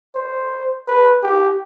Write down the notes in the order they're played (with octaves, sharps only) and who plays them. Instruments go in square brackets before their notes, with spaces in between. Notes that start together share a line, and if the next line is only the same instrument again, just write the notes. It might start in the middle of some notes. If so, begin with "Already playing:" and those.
[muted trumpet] C5
B4
G4